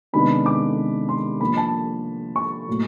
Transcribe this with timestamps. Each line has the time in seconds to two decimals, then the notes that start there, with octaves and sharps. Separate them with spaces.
0.13 C3 D#3 G#3 B3 D4 B5
0.46 D6
1.09 C6
1.41 F3 A#3 D4 B5
1.57 A5
2.36 C#6
2.68 A2 F#3 A#3